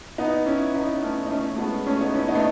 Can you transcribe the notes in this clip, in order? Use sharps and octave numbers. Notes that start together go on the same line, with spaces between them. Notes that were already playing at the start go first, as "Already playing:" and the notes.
B3 D#4
C#4 E4
B3 D#4
B3
A3 C#4
D#4
A3 C#4
A3
G#3 B3
A3 C#4
B3 D#4
C#4 E4
B3 D#4
A3